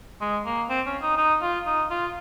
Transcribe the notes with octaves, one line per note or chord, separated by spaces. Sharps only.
G#3
A#3
C4
C#4
D#4
D#4
F4
D#4
F4